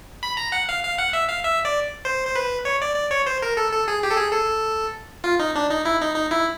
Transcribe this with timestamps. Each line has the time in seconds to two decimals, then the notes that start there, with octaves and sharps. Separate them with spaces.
0.23 B5
0.37 A#5
0.52 F#5
0.69 F5
0.84 F5
0.98 F#5
1.13 E5
1.29 F5
1.45 E5
1.65 D5
2.05 C5
2.27 C5
2.36 B4
2.65 C#5
2.82 D5
2.96 D5
3.11 C#5
3.27 C5
3.42 A#4
3.57 A4
3.73 A4
3.88 G#4
4.03 G4
4.11 A4
4.18 G#4
4.33 A4
5.24 F4
5.40 D#4
5.55 D4
5.70 D#4
5.85 E4
6.01 D#4
6.15 D#4
6.31 E4